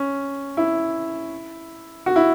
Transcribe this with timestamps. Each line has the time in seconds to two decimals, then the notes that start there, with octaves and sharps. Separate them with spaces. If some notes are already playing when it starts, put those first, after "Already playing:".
Already playing: C#4
0.57 E4
2.06 F#4
2.16 E4